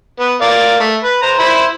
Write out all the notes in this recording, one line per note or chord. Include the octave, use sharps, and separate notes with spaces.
B3
A#4 D5 F5
A3
B4
C5 A#5
E4 C5 B5